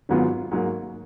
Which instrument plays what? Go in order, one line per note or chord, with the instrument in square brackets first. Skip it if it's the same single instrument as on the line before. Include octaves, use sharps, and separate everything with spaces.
[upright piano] G#1 G#2 F#3 B3 F4
G#2 F#3 A#3